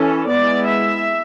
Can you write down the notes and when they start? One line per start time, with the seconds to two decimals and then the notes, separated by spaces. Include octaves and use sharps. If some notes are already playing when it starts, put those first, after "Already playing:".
Already playing: E3 C#4 A4
0.29 G#3 B3 E4 D5
0.67 E5